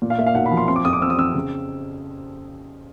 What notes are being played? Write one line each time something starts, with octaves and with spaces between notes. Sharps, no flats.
A#2
F5
A#3 E5
F5
B1 F#5
B5
F3
C6
C4 C6
D6
F2 D#6
D6
C4 E6
D#6
C4 E6
C#3